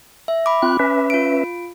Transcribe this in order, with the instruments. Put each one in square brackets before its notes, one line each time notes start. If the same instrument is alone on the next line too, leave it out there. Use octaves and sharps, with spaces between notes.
[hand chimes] E5
B5 D6
[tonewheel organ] C4 F4 F#6
C#4 B4 E5
[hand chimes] F4 D7